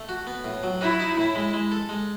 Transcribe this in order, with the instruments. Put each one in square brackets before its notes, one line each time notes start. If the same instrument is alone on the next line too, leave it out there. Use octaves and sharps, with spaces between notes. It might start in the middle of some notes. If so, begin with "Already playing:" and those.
Already playing: [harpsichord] A3
F#4
B3
A2
F#3
[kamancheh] E4 [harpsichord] F#4
[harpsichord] D#4
[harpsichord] A2 [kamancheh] E4
[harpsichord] G#3
G#3
A4
G#3